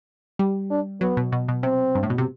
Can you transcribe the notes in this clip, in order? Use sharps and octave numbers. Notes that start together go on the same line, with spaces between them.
G3
D4
F#3 B3
B2
B2
B2
C3 C4
G2
A2
B2
C3